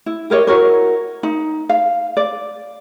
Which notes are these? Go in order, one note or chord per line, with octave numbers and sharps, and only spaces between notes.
E4
G4 A#4 C#5 D#5
E4 F#4 A#4 C#5
D#4
F5
D5